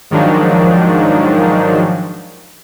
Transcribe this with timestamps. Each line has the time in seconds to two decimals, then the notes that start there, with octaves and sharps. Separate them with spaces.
0.10 G#2 D#3 F3 F#3 D4